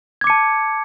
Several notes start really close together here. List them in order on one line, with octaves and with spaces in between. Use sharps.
G#6 D6 C#7 A5